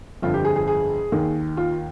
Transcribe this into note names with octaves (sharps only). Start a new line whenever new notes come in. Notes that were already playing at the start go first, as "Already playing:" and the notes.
G1 F2 D3 F4
G4
G#4
G#4
G#4
D#2 D#3
F4